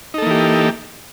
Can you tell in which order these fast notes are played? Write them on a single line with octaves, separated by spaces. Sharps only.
D#4 A4 A#3 E3 G4